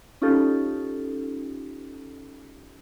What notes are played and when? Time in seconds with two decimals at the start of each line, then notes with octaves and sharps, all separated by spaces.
0.22 C#4 D#4 F4 G4 A4